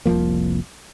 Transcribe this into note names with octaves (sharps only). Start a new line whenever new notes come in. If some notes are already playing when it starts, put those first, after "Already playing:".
F1 C2 F3 A#3